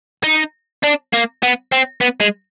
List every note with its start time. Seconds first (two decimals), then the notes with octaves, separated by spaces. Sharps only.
0.24 D#4
0.83 D4
1.13 A#3
1.43 B3
1.72 C4
2.01 B3
2.20 G#3